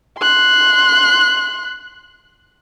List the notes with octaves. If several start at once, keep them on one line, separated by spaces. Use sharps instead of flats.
C6 F#6